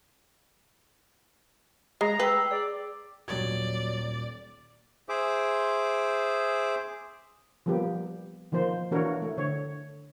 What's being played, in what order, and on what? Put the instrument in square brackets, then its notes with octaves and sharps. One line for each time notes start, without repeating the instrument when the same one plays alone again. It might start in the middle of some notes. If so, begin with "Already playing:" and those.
[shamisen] G#3 [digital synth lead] A#5 [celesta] C7
[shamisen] B4 [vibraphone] G5 [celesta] E6 B6 C7
[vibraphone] G#4 [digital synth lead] D5
[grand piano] D#1 D6 G#6 [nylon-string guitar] F#3 G4 [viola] D5
[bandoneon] G#4 C5 E5 D6
[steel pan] F3 G3 A#3 B3 G4
D#3 F3 A#3 C5
E3 A#3 D4 F#4 A#4 C#5
A3
D3 C#5